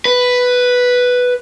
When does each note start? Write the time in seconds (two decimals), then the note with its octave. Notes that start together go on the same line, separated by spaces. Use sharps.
0.05 B4